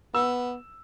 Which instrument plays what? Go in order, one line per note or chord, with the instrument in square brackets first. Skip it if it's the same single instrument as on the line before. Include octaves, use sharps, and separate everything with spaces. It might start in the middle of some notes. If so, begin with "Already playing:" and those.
[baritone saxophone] B3 [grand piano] E6